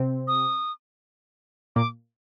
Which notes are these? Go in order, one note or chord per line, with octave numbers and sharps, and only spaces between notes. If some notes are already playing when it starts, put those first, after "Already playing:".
Already playing: C3 C4
D#6
A#2 A#3 D6